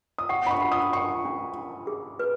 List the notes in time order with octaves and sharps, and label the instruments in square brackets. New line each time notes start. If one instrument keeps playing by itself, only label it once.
[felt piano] D#6
[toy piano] F#5 [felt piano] C#6
[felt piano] B5
C#6
[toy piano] F#5
[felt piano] D#6
[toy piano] F#5 [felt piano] C#6
[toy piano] C#4
C#4
G#4
B4